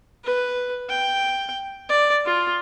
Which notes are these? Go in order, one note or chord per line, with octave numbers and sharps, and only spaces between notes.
B4
G5
D5
F4